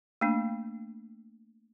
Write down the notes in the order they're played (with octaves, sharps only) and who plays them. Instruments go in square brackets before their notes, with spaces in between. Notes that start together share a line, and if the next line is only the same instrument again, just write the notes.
[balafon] A3 A#3 D4